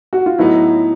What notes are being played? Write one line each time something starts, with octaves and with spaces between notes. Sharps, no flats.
F#4
F4
A2 F#3 B3 D#4 E4